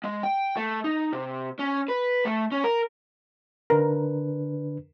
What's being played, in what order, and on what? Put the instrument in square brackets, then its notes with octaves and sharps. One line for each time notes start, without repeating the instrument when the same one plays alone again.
[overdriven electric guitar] G#3
G5
A3
D#4
C3
C#4
B4
A3
C#4
A#4
[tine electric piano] D3 D4 B4 [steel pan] A#4